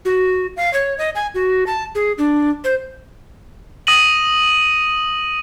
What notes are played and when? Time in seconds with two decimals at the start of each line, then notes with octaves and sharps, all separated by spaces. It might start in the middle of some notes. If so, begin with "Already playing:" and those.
0.05 F#4
0.57 F5
0.74 C#5
0.98 D#5
1.15 G#5
1.34 F#4
1.67 A5
1.95 G#4
2.18 D4
2.64 C5
3.87 D#6 A#6 D#7 F#7